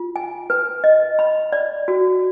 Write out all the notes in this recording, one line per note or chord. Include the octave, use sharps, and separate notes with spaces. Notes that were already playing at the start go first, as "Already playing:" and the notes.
Already playing: F4
G#5
B4
D#5
B5
D5
F#4